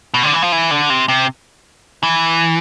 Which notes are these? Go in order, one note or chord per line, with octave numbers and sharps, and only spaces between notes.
B2
D3
E3
F3
E3
D3
C3
C3
E3